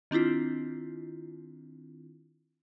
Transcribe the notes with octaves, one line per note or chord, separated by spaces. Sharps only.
D#3 C4 D4 E4 F4